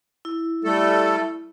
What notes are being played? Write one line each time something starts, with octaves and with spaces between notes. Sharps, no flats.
E4
G3 A3 A4